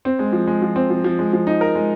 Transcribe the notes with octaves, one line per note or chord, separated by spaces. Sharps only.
C4
G#3
F3
G#3
F3
C4
F3
F3
G#3
F3
D#4
A#4
G#3